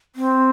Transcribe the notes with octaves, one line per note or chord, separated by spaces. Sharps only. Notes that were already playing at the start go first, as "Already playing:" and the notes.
C4